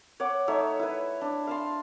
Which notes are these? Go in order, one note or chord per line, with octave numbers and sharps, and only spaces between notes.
C#5 F#5 D6
A3 D#4 C#5 E5
E4 B4
D4
F5 A5 C6